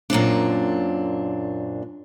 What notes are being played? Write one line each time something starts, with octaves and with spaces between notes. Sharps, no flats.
F#2 A#2 C4 D4